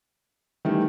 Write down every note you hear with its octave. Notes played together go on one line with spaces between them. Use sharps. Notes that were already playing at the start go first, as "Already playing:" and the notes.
D#3 E3 G3 A3